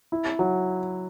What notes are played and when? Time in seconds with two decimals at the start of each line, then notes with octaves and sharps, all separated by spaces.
0.12 E4
0.39 F#3